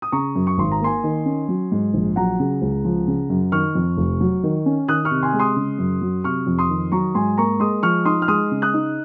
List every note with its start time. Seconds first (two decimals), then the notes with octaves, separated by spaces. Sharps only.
0.02 D#6
0.12 C#3 A#5 C#6
0.35 F#2
0.47 C#6
0.58 G#1 C6
0.72 A#5
0.81 A#3 G#5 C6
1.04 D#3
1.26 C#4
1.48 F#3
1.72 G#2
1.94 A#1
2.16 F#3 F#5 A#5
2.39 C#3
2.62 C#2
2.85 F3
3.07 C#3
3.30 F#2
3.52 D#3 C#6 F6
3.75 F2
3.97 F1
4.21 F#3
4.43 D#3
4.66 C#4
4.88 D#3 D#6 F#6
5.05 C#6 F6
5.11 C3
5.23 G#5 C6
5.33 G#3
5.39 C6 D#6
5.56 C#3
5.79 F#2
6.01 F#3
6.24 C3 C#6 F6
6.47 F2
6.59 C6 D#6
6.69 D#3
6.92 F#3 A#5 C#6
7.15 G#2 G#5 C6
7.38 A#3 A#5 C#6
7.60 G#3 C6 D#6
7.83 F3 C#6 F6
8.05 D#4 C6 D#6
8.22 F6
8.28 G#3 C6 D#6
8.51 C#3
8.62 D#6 F#6
8.74 D#4